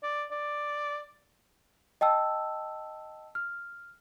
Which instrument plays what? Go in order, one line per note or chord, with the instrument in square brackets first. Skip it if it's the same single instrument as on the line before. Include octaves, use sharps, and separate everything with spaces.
[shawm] D5
D5
[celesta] D#5 G5 A5 E6
F6